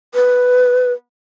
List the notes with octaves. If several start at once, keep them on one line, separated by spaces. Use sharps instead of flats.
B4